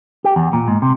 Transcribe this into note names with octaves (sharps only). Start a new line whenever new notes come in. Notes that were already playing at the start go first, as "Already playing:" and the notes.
G4
E2
A#2
G#2
C3